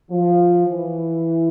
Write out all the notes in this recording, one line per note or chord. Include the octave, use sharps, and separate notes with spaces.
F3
E3